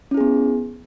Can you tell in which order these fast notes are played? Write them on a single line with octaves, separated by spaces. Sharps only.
C#4 E4 G#4 B3